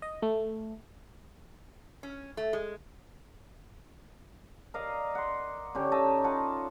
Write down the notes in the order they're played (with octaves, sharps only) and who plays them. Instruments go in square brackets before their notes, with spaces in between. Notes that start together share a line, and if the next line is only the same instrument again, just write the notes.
[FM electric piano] D#5
A3
[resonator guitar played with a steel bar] C#4
A3
G#3
[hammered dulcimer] A#4 D5 D#5 F5
F#5 C6
D3 C#4 G4
D#4 D#5 E5 A5
F4 F#5 A5